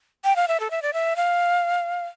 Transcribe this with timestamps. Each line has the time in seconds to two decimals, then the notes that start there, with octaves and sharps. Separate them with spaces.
0.24 G5
0.36 F5
0.48 E5
0.60 A4
0.71 E5
0.82 D5
0.93 E5
1.16 F5